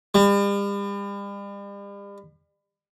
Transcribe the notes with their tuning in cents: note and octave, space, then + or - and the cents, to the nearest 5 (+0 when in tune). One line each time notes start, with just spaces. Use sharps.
G3 +40